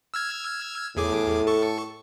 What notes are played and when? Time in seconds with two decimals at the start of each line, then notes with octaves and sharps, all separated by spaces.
0.14 E6 F6 G#6
0.97 E2 A2 G#4 D6
1.47 A4 C#6